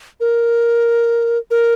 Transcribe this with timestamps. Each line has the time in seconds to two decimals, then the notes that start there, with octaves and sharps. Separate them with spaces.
0.20 A#4
1.51 A#4